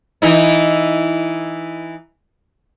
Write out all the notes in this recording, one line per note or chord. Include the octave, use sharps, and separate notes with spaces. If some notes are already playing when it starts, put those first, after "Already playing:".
E3 D#4 E4